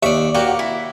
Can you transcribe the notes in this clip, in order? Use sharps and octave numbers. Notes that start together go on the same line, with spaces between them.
D#2 D5 E5 C#6
A#3 F#4 G4
E4